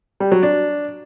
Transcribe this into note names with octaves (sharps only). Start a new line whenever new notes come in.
G3
F#3
D4